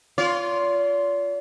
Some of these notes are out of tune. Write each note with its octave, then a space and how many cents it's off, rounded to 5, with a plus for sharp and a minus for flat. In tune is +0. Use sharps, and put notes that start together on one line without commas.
F4 +0 D5 -45